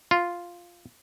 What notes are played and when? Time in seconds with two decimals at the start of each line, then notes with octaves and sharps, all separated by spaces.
0.11 F4